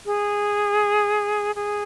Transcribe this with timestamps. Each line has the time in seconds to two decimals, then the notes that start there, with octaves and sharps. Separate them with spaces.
0.06 G#4
1.55 G#4